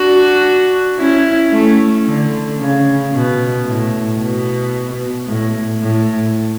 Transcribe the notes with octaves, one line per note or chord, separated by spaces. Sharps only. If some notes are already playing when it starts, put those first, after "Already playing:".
Already playing: D4 F#4
C#4 E4
A3 C#4
D3
C#3
B2
A2
B2
A2
A2